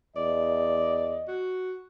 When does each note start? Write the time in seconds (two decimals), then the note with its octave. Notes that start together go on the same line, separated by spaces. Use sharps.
0.16 E2 D5 D#5
1.28 F#4